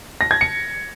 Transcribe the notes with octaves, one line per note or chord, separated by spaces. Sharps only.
A#6
G#6
C#7